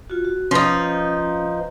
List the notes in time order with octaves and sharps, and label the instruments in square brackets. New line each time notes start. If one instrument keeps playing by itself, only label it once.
[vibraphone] F4 F#4
F#4
[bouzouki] F3 D#4 [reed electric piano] C#4 [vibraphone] B4